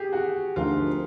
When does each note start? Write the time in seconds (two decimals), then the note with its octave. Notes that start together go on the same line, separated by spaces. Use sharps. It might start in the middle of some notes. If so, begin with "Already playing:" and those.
Already playing: G4 G#4
0.13 F#4
0.56 D2 D3 F3 A#3 D#4 F4